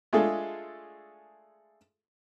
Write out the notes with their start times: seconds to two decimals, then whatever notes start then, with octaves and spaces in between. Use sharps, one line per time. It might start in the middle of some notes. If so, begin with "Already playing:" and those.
0.13 G#3 A3 D4 F4 G#4 A4